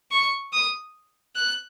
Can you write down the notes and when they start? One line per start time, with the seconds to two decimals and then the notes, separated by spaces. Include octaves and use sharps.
0.11 C#6
0.53 D#6
1.36 F#6